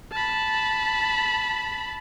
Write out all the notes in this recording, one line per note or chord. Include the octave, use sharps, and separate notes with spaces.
A5 B5